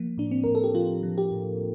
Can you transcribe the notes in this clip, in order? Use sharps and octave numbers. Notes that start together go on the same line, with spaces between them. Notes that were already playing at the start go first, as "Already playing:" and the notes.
Already playing: F3 A#3
A2 D4
C4
A2 A#4
A4
G4
F3 F4
F3
G4
A2